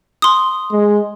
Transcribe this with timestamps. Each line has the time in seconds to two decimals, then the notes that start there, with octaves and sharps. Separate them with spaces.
0.22 C6 D#6
0.72 G#3